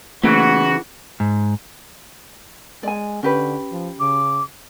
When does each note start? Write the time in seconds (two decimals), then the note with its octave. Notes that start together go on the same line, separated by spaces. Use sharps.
0.24 C#3 E3 A3 A#3 F#4
1.20 G#2
2.83 G#3 D5 G#5
3.23 D3 C#4 G4 B4
3.71 F3
4.00 C#3 D6